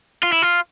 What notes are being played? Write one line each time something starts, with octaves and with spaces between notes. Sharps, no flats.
F4
E4
F4